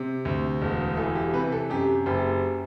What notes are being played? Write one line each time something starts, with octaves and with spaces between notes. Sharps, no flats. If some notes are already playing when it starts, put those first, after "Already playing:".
Already playing: C3
D2
E1
E3 A4
G4
C3 B4
A4
F#2 G4
F#1 G4